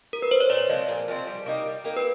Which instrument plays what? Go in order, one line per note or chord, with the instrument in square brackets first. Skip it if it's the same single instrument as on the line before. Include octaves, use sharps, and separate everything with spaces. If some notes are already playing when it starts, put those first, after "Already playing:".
[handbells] A#4
B4
C5
C#5
[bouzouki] A#2 [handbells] D5
[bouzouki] F3 G#3 C4
A#2
F3 G#3 C4
G3
A#3 D#4 G4
G3
A#3 D#4 G4
[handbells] B4